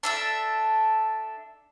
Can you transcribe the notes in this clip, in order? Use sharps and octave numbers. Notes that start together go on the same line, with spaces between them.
D4 A4 E5